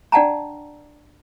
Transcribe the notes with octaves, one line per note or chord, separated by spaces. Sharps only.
D4 D5 F#5 G5 A5 A#5